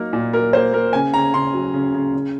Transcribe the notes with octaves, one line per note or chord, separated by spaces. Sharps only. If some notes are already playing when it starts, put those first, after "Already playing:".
Already playing: F#3 A#3 D#4 A#4
A#2
F#3 A#4
A#3 C5
A#3 A#4
C#3 G#5
C#3 A#5
C#3 C6
F#3
C#3
C#3
C#3